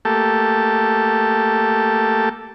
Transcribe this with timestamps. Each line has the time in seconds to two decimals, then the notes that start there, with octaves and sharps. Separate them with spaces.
0.05 A3 A#3 G4 A4